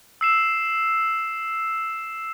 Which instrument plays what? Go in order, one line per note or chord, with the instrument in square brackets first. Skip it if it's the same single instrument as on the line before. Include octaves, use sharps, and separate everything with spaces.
[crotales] E6 C7 E7